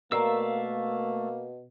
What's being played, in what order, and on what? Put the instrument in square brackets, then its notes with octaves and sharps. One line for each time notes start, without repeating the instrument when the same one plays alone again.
[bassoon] B2 [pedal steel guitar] A3 F5 E6 [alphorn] A#3 [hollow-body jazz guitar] A#4 D5 A#5